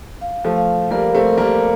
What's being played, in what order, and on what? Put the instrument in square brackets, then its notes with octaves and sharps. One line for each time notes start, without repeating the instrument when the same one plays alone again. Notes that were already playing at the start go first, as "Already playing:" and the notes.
[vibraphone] F5
[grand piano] F3 A3
[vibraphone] F5
[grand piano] G3 A#3 [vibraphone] A#4
[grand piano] A3 C4
[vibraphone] A#4
[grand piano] G3 A#3